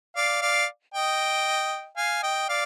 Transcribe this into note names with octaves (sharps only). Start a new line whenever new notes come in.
D5 F5
D5 F5
D#5 G5
F5 G#5
D#5 G5
D5 F5